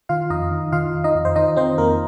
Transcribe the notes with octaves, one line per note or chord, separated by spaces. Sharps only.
D#3 F4 F5
F2 D#4 D#5
D#3
D#3 F4 F5
D#3
D#4 D#5
F2
C5
D#3 D#4 D#5
D#3 C4 C5
F2 A#3 A#4